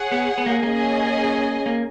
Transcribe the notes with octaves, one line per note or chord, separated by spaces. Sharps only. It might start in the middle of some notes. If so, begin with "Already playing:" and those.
Already playing: G#4 C#5 F#5
B3
B3
A#3
A#3 C#4 G#4 D#5 G#5
A#3